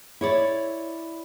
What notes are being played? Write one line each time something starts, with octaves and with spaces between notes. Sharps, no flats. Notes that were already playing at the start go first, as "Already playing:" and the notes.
E4 C#5 D5